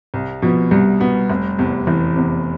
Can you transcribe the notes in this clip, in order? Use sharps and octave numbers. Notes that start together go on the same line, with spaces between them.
C2
B2 F3 B3
C2 G3
B2 B3
F1
E2 C3
F1 E3
E2 C3